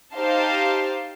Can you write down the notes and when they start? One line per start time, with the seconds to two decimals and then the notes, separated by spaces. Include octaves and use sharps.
0.15 D#4 G4 C5 F5 A5